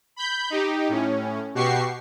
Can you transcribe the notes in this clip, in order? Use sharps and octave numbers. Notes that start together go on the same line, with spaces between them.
B5 G6
D#4 G4
A2 C#4
B2 F#4 G4 C#6 C7